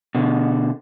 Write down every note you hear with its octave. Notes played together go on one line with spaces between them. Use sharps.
B2 D3